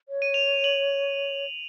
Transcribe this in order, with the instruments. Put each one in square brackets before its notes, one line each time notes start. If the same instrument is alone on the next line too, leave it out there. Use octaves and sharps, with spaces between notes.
[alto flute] C#5
[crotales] D#7
F7
F#7